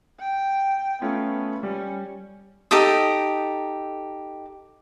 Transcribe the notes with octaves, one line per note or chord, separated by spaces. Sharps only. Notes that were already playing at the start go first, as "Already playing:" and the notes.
G5
A3 B3 C#4 F4
G3 C#4
D#4 G4 A4 D#6